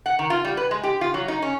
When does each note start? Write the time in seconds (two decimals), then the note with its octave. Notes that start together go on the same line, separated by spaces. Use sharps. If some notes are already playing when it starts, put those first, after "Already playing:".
0.06 F#5
0.19 D#3
0.30 F4
0.45 G3
0.57 B4
0.71 G#3
0.84 G4
1.01 F4
1.14 F#3
1.28 D#4
1.42 C#4